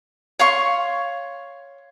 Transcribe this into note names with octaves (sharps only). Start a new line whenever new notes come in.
C#5 F5 C6 C#6